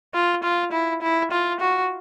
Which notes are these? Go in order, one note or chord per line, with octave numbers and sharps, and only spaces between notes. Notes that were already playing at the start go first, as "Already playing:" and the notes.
F4
F4
E4
E4
F4
F#4